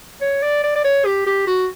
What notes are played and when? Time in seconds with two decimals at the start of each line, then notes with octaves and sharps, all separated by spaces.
0.21 C#5
0.42 D5
0.63 D5
0.75 D5
0.84 C#5
1.05 G4
1.26 G4
1.47 F#4